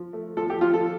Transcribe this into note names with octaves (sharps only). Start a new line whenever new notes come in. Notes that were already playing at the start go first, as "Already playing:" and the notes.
Already playing: F3
A3
F3 A4
G4
F3 F4
A4